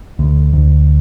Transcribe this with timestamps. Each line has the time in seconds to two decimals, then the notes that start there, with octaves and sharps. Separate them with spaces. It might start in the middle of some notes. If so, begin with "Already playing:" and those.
0.19 D2
0.53 D2